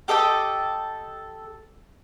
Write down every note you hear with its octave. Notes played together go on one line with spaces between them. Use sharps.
G4 A4 D#5 G5